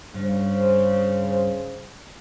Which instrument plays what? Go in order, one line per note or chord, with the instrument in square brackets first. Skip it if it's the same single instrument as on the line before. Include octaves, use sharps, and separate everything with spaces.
[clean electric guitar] G2 [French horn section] C#3 C5